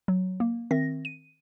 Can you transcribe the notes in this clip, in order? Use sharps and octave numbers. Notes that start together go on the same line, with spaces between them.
F#3
A#3
D#3 C4 E5 A#6
D#7